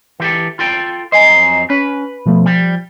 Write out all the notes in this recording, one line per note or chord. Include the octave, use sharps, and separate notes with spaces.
E3 G4 A4
F4 A4 G5
F2 F#3 C5 D#5 G#5 A#5
C#4 B4
B2 F3 A3
F3 G3